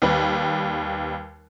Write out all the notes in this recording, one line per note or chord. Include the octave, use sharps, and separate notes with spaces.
D#2 G3 B4